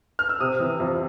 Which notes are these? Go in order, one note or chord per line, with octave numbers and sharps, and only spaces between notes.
F6
E6
C3 D#6
E3
F2